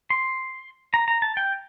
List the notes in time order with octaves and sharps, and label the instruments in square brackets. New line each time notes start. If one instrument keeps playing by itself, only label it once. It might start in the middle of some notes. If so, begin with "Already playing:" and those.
[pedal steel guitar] C6
A#5
A#5
A5
G5